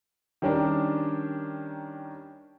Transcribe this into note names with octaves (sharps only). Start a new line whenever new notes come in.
D#3 G3 C#4 D4 A#4